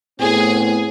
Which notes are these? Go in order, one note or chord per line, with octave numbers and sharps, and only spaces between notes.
A2 B3 C4 G#4